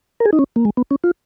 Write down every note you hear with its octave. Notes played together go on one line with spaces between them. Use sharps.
A#4
G#4
D#4
C#4
A#3
G#3
B3
C#4
F4